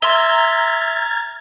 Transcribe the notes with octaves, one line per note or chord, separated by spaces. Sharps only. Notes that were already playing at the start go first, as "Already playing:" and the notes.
E5 A#5 C6 F6 G#6 A6 G7